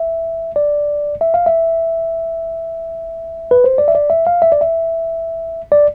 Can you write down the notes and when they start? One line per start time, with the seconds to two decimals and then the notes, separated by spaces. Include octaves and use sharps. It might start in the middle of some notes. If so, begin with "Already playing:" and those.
Already playing: E5
0.56 D5
1.21 E5
1.34 F5
1.46 E5
3.51 B4
3.64 C5
3.78 D5
3.88 E5
3.95 D5
4.10 E5
4.27 F5
4.42 E5
4.52 D5
4.61 E5
5.72 D5